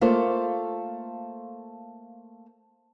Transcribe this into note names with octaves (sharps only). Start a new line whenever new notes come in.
A3 A#3 F4 A4 C5